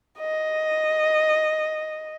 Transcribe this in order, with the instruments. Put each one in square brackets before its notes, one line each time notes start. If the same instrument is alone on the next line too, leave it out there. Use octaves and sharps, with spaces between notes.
[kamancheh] D#5